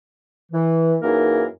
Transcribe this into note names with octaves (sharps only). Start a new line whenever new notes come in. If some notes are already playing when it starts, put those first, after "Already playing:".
E3
F#2 E3 A#3 D#4 G#4 A#4